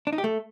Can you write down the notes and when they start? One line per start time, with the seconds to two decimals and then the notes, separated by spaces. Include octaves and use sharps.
0.07 D4
0.13 D#4
0.18 G4
0.24 A3